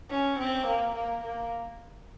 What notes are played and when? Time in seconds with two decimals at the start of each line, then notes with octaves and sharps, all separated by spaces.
0.10 C#4
0.39 C4
0.67 A#3
0.95 A#3
1.24 A#3